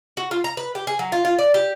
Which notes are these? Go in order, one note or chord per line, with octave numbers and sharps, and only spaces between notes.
F#4
F4
A#5
B4
G4
G#4
F#3
F4
F4
D5
G4